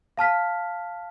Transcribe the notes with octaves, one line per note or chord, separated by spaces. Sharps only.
F5 A5 F6 B6